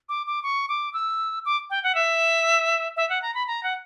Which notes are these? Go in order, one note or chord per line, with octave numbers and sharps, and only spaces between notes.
D6
D6
C#6
D6
E6
D6
G5
F#5
E5
E5
F#5
A#5
B5
A#5
F#5